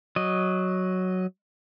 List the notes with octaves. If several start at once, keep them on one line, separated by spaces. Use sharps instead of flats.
F#3 D#5